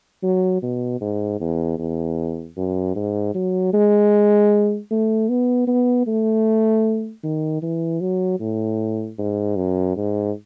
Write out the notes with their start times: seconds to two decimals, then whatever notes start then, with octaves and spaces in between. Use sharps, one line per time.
0.23 F#3
0.63 B2
1.01 G#2
1.40 E2
1.79 E2
2.57 F#2
2.96 G#2
3.35 F#3
3.73 G#3
4.91 A3
5.29 B3
5.67 B3
6.07 A3
7.23 D#3
7.62 E3
8.01 F#3
8.40 A2
9.18 G#2
9.56 F#2
9.96 G#2